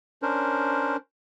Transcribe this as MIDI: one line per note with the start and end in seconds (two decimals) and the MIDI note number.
0.22 0.97 61
0.22 0.97 62
0.22 0.97 70
0.22 0.97 72